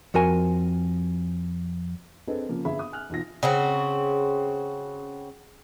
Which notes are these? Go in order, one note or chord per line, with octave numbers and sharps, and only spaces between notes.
F2 F#4 A#4 G#5
C4 D4 G#4 A4 B4 D#5
C#3 F3 A#3
G1 G#4 E5 B5
D#6
G#5 F6 F#6
B1 E2 F4 A#6
C#3 C4 F#4